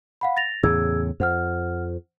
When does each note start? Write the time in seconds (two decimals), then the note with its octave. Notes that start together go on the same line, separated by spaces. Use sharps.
0.21 F5 F#5 B5
0.37 A6 A#6 F7
0.63 E2 A2 C#3 G#4 E6 G#6
1.20 F2 C5 F#5 F6